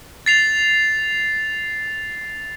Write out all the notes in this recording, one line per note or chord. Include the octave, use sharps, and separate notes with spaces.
A6 C7 F7